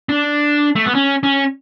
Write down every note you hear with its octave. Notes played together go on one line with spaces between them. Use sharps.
D4
A3
B3
C#4
C#4